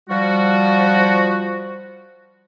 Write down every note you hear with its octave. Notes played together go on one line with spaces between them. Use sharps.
F3 G3 F#4